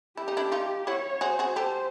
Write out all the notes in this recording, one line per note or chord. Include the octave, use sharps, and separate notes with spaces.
E4 G4
D#4
D4 E4
D#4 F4
E4 F#4 C#5
F#4 G#4 C5
F#4 G#4
G4 A4 C5